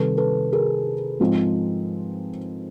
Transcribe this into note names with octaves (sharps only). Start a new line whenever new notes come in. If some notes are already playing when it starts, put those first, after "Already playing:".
Already playing: C3 D#3 G3 A4 B4
A4 B4
G#4 A#4
G#2 F3 G#3 C4